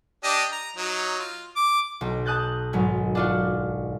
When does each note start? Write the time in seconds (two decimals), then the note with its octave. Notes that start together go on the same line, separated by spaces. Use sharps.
0.24 D4 G4 D#5
0.52 A#5
0.77 F#3 D#4
1.20 F4
1.56 D6
2.01 B1
2.26 A5 D#6 F#6 G6 A6
2.73 G#1 F#3
3.15 D4 F4 F#4